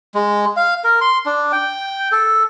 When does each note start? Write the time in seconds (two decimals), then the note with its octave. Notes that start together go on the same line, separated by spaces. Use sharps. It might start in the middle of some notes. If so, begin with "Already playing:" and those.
0.15 G#3
0.57 F5
0.84 A#4
1.01 C6
1.26 D4
1.52 G5
2.12 A4